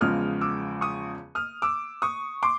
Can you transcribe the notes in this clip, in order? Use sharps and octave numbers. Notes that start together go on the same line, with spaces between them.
E2 C#3 F3 G#3 D#6 F6
D6 E6
C#6 D#6
D#6 F6
D6 E6
C#6 D#6
C6 D6